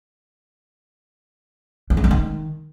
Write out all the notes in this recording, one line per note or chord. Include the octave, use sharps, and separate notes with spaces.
E3
A3
G#3
D#3